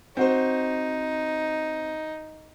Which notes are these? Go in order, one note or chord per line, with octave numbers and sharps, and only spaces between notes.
C4 D#4 F#4 C5